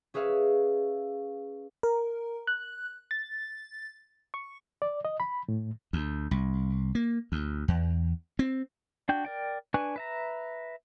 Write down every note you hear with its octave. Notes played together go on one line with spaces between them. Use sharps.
C#4 G#4 B4 E5 F5
A#4
F#6
A6
C#6
D5
D#5
B5
A2
D2
C2
A#3
D2
E2
C4
D4 F#4 G5 G6
A#4 D5 G5
D4 B4 G#5 C#6 F#6
B4 E5 A#5